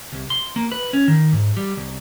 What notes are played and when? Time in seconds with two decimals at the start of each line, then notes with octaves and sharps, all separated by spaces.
0.12 C2
0.30 C6
0.56 A#3
0.72 B4
0.93 C#4
1.08 D#3
1.33 G#2
1.57 G3
1.77 C2